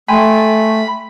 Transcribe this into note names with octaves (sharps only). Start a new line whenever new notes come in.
A3 G5 G#5 B5 C6